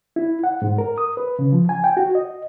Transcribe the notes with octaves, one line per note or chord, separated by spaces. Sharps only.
E4
F#5
G#2
A#4
D#6
B4
C#3
F3
G#5
G5
F#4
D#5